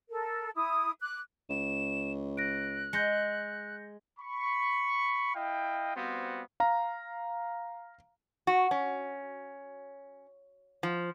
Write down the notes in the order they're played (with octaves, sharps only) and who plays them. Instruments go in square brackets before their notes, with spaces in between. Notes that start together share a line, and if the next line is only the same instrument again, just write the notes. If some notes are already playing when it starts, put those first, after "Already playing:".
[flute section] A4 A#4
E4 D#6
D6 F#6
[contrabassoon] C#2 [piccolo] E7
[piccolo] F#6 [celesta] A#6 D7
[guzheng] G#3 [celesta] G6 A#6 C#7
[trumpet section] B5 C#6
E4 D#5 F5 G5
G3 B3 C4 F#4 C5 F5
[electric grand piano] F5 A#5
[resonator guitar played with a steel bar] F#4
C#4
F3